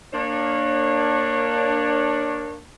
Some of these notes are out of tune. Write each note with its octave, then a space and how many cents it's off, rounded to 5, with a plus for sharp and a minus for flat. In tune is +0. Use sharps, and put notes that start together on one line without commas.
A#3 +0 D4 +10 C#5 -20